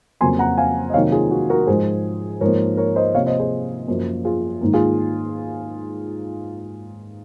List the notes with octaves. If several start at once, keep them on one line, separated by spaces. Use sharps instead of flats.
F2 C#3 F#3 A#3 G#5 C6
F#5 A#5
F5 G#5
D#5
C3 D#3 F#3 A#3 C#5 F5
F4 G#4
F#4
F#4 A#4
G#2 F3 G#3 G#4 C5
G#2 F3 A#3 A#4 C#5
A#4 C#5
C5 D#5
C3 F3 A#3 C#5 F5
C5 D#5
G#4 C5
F#2 F3 A#3
F4 G#4
G#2 D#3 A#3
F4 G#4